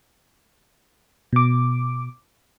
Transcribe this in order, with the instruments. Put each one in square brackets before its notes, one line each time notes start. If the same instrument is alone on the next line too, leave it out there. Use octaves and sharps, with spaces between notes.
[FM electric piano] B2 D6